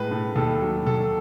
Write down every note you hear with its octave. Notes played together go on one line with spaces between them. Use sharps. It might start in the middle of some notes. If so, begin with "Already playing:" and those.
Already playing: A2 G#3 B4
A2
D#2 A4
F#3
D#2 A4